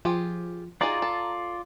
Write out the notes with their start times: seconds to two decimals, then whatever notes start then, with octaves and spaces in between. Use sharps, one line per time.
0.05 F3 F4 G4 G#4
0.81 D#4 F4 F#4 G#4 D5 A#5
1.02 A4